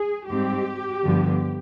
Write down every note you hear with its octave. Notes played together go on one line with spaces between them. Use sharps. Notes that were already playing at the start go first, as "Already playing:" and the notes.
Already playing: G#4
G#2 G3 C4 G4
G2 D3 F3 B3